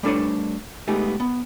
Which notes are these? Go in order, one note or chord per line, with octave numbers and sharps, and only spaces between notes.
G3 A3 D4 A4 B4 C#5
G#3 A3 B3 D#4 G4
B3